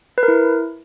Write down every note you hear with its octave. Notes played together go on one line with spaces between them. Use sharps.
B4
A#4
E4